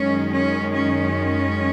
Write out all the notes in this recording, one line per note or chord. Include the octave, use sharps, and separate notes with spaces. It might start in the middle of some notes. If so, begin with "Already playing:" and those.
Already playing: F#2 D#3 G#3 C#4
C#4
C#4